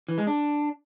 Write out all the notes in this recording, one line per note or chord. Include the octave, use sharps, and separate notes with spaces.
E3
G#3
D4